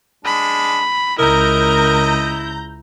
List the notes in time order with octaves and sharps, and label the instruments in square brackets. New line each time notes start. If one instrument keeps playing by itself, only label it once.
[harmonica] G#3 D4 [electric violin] B5
[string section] C#2 A#5 G6 [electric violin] E4 [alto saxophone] A#4 [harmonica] D#5